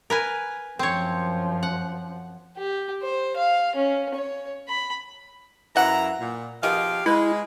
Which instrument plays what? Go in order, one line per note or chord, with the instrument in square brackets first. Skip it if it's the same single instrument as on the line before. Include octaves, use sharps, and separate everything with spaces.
[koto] A#4 B4 G#5
[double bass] F#2 F3 [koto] C4 C#5
[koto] F#5
[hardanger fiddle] G4
C5
F5
C#4
C#5
B5
[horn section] F#2 E4 A#5 [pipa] E3 F#5
[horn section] A#2
[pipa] B2 D#3 G#4 [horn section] F3 G4 F5
[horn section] G#3 [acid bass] E4 [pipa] B4